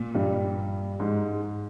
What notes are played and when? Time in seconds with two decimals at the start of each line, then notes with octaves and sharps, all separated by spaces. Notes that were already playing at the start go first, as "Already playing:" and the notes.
Already playing: A#2
0.15 G2 G3
1.00 G#2 G#3